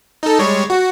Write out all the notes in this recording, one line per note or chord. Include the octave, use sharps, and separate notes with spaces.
D#4 A4
G3 G#3 C#5
F#4